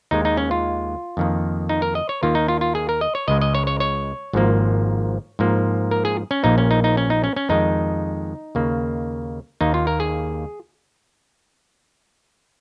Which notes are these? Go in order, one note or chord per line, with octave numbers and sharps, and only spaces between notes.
D#2 D#3 G#3 D#4
D#4
C#4
F4
F2 D#3 A#3
D#4
A#4
D#5
C#5
D#2 D#3 A#3 F4
D#4
F4
F4
G#4
A#4
D#5
C#5
C#2 C#3 G#3 D#5
D#5
C#5
C#5
C#5
G#1 G#2 F3 A#3
G#2 F3 A#3
A#4
G#4
C#4
A#1 A#2 A#3 D#4
C#4
D#4
D#4
C#4
D#4
C#4
C#4
F2 D#3 G#3 D#4
D#2 C#3 A#3
D#2 D#3 A#3 D#4
F4
A#4
G#4